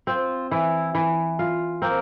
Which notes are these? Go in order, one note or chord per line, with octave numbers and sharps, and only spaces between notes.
C4 F4
E3 E4
E3
F4
A#3 C4 A#4